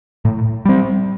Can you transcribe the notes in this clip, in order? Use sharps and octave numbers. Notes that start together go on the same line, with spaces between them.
A2
G3 C4